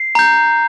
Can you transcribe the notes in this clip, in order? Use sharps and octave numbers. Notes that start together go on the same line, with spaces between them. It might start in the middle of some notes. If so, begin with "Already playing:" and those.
Already playing: C7
A#5 G6